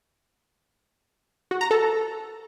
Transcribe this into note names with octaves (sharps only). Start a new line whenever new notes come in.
F#4
A#5
A4